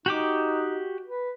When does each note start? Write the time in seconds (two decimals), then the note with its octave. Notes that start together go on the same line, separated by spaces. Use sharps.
0.06 D#4 F#4 G4 D6
1.06 B4